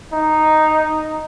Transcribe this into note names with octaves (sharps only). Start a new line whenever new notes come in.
D#4